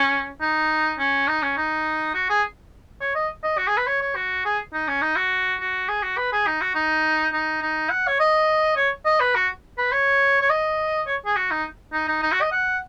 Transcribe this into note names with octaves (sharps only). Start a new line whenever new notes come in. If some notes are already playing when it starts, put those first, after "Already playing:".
Already playing: C#4
D#4
C#4
D#4
C#4
D#4
F#4
G#4
C#5
D#5
D#5
F#4
G#4
B4
C#5
C#5
F#4
G#4
D#4
C#4
D#4
F#4
F#4
G#4
F#4
B4
G#4
D#4
F#4
D#4
D#4
D#4
F#5
C#5
D#5
C#5
D#5
B4
F#4
B4
C#5
C#5
D#5
C#5
G#4
F#4
D#4
D#4
D#4
D#4
F#4
D#5
F#5